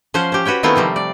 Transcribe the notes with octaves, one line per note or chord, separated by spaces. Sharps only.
F3 C#4 F4 C5 F#5
C#4 G4
F#4 B4 C#5 G5
D#3 A3 B3 C4 E4 F4
C3 F3 G3
D5